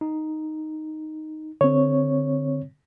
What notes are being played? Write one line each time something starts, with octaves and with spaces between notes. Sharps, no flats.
D#4
D3 C4 C#5